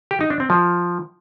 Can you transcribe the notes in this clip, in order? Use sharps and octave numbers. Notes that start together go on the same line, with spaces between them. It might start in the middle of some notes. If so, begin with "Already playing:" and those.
G4
D#4
D4
C4
F3